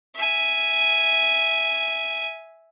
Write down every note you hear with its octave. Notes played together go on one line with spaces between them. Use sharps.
E5 G#5